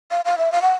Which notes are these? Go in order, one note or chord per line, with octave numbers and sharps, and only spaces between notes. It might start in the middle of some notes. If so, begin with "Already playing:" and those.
F5
F5
E5
F5
F#5